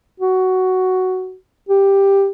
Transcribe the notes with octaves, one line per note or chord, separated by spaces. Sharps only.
F#4
G4